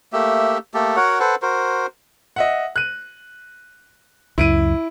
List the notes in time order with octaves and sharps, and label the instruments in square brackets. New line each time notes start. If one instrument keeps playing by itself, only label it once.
[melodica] A3 A#3 G4 E5
A3 A#3 G4 A4
F#4 A#4 C#5 F#5
A4 B4 C5 F#5
F#4 A#4 C5
[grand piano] D#5 E5 F#5
F#6 D#7
[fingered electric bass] C#2 F#2 [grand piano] E4 D7 D#7